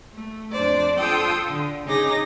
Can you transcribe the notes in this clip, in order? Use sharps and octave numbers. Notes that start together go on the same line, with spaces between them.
A3
F2 D4 C5 D5
F4 A4 G5 D#6 E6
D3
C#3 D#4 G#4 D6 A#6